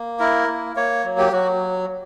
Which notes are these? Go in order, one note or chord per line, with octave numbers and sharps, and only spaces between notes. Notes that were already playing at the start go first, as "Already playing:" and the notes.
Already playing: A#3
E4 A#4
A#3
A#3 C#5
F#3
G4
F#3 F#4